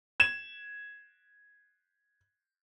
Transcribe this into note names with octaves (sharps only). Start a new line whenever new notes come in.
G#6 E7